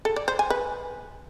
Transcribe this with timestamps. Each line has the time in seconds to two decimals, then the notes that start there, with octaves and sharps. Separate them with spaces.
0.05 A4
0.16 D5
0.28 C5
0.39 G#5
0.50 B4